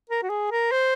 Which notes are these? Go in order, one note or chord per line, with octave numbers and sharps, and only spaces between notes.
A#4
F#4
G#4
A#4
C5